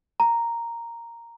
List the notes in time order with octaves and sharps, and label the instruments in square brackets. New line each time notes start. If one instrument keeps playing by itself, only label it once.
[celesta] A#5